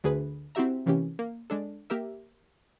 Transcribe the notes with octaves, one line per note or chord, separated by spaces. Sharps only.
D2 G#4 B4
C4 E4 F#4 G4 E5 A#5
C3 E3 A#3 C#4 G4
A#3
G#3 D4 A4
A#3 G4 A#4 E5